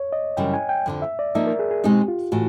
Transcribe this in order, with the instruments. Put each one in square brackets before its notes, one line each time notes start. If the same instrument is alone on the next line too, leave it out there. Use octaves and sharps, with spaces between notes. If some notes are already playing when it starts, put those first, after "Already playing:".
Already playing: [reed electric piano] C#5
D#5
[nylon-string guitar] F#2 C#3 E3 G3 [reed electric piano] G5
[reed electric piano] G#5
G5
[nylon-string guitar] F2 D3 F3
[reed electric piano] E5
D5
[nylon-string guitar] F3 A#3 D#4 [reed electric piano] E5
[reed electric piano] A#4
G#4
G#4
[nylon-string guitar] B2 G#3 C4 D#4 [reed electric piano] G4
[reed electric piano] F4
[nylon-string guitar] A2 E3 [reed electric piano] F#4